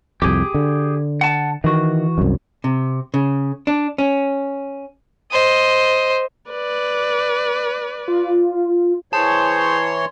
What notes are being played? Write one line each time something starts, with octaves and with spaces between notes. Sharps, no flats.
C2 F2 G4 G#4
D3
F#5 A5
D#3 E3 F#4
C2 F#2
C3
C#3
D4
C#4
C5 D#5
B4 D5
F4
E3 G#4 C5 C#5 A5 C6